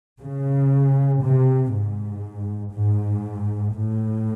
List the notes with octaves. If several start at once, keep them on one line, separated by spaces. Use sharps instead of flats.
C#3
C3
G#2
G#2
A2